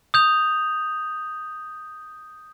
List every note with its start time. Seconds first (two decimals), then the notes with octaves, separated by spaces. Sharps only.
0.14 D#6 G6 F7